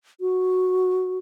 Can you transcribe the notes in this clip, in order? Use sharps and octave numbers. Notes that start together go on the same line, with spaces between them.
F#4